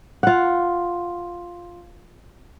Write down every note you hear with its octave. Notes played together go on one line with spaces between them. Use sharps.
F4 F#5